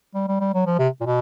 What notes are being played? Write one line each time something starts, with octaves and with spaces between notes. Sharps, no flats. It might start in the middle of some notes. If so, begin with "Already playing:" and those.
G3
G3
G3
F#3
F3
C3
A#2
B2